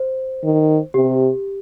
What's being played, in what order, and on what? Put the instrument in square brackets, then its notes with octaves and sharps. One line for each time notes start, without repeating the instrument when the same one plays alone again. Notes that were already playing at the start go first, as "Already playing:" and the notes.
Already playing: [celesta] C5
[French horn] D#3
[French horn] C3 [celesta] G4